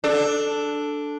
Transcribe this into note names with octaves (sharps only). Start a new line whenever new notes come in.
D4 A4